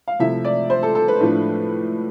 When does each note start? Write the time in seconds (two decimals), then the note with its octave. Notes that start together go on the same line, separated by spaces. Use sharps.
0.08 F5
0.19 C3 F3 A3 E4 E5
0.45 D5
0.70 C5
0.83 A4
0.95 A4
1.08 B4
1.20 A2 F3 A3 D4